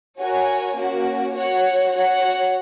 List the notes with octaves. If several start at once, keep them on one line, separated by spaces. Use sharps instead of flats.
F#4 A#4 C#5 G#5
A#3 C#4 F#4
F#4 C#5 F#5
F#4 C#5 F#5